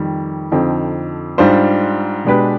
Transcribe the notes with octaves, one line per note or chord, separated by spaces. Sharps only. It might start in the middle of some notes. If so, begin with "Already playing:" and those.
Already playing: F2 D#3 G3
F2 D3 F3 C4 D#4
G#2 G3 D4 F4 C5
B2 G#3 D4 G4 B4